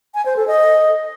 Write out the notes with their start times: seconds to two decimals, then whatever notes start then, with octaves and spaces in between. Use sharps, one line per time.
0.15 G#5
0.26 C5
0.37 A4
0.48 D#5